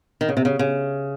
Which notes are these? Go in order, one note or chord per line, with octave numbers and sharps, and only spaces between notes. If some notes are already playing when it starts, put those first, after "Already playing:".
D#3
C#3
C3
C#3
C#3